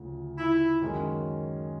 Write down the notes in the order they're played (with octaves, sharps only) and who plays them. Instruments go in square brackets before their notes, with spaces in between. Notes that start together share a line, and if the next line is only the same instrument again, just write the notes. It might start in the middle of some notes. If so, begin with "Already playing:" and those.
Already playing: [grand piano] D2 C#3 F3 A3
[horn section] E4
[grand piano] F#2 D#3 G#3 C#4